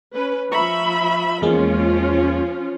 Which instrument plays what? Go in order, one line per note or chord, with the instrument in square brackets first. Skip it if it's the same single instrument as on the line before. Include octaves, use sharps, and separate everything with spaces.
[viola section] C#4 B4
[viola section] F3 E5 B5 [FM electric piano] A#5 C#6
[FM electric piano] E2 G#3 A#3 [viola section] F3 C#4 F4